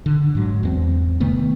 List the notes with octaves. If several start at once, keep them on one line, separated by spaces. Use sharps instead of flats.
D3
G#2 F#3
E2 A3 C4
C3 D#3 A3 B3